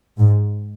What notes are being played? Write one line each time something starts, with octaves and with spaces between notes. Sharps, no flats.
G#2